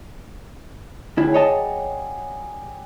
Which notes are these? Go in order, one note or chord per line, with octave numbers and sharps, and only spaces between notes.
D2 F#3 G3 E4 G#4
C#5 D#5 A5